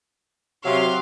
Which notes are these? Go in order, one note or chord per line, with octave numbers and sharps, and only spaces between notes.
C3 F#3 F5 C6